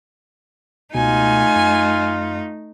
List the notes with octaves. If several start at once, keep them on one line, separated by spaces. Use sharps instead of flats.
C#2 B2 A3 D#4 F4 G#5
F#2